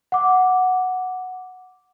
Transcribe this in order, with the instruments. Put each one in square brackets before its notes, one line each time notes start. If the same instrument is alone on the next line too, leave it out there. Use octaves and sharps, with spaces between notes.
[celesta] F#5 D6